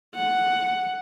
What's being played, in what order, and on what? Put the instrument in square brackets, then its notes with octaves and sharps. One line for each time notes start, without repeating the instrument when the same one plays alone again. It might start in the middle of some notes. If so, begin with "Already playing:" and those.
[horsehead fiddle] F#5